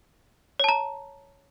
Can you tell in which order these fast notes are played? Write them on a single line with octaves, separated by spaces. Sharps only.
C#5 A5 A#5